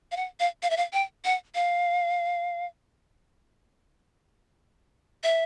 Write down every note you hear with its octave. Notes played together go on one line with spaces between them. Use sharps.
F5
F#5
F5
F5
E5
F5
G5
F#5
F5
E5